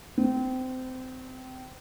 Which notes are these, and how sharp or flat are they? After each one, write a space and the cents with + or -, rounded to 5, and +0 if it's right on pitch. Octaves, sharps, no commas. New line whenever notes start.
C4 -25